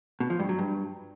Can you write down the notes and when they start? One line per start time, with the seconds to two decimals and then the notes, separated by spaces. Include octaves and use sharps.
0.20 B2
0.30 F3
0.40 G2
0.49 F#3
0.59 G2